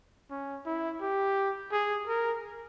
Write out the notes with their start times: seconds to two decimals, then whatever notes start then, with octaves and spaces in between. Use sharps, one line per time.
0.31 C#4
0.66 E4
1.01 G4
1.72 G#4
2.08 A#4